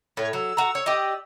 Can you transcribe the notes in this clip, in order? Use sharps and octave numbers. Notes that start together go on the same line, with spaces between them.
A2 C#5
F#3 E6
F#4 A#5
C#5
G4 D5 D#5